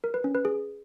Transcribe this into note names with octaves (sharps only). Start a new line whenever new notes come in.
A#4
B4
C#4
B4
G#4